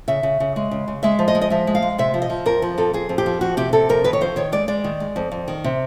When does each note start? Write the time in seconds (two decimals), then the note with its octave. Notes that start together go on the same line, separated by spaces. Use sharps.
0.08 C#3 E5
0.23 C#3
0.40 C#3
0.56 G#3
0.71 C#3
0.88 C#3
1.03 G#3 E5
1.19 F3
1.28 D#5
1.35 G#3
1.41 D#5
1.50 F3 E5
1.67 G#3
1.75 F5
1.82 G#3
1.98 C3 E5
2.14 F3
2.22 D#5
2.30 F3
2.46 F2 A#4
2.62 F3
2.78 F2 A4
2.93 F2 G#4
3.09 F2
3.18 G4
3.26 F3
3.41 F2 F#4
3.57 C3 G4
3.73 C3 A4
3.89 F2 A#4
4.04 D#3 B4
4.13 C#5
4.21 F2 C5
4.36 D#3 C#5
4.52 G#3 D5
4.68 G#3 D5
4.84 D#3
5.00 G#3
5.16 F2
5.31 F2
5.48 D#3
5.64 C3